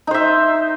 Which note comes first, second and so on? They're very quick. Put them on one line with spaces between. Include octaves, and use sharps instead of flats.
D#4 C5 E5